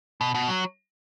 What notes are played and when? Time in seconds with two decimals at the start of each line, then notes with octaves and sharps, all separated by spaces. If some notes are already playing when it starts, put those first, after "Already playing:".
0.21 B2
0.34 B2
0.48 F#3